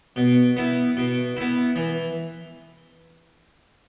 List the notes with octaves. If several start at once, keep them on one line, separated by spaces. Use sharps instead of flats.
B2
B3 E4
B2
B3 E4
E3